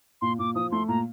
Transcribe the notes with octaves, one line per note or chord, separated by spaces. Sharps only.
A#2 C6
A#2 D6
F3 D#6
A3 C6
A#2 A#5